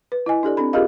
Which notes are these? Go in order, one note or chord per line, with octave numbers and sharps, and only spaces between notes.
B4
E4 D#5 G#5
D4 G4 A4 D5
C4 D4 A4 B5
F4 G4 G#4 A#4 D#5 F5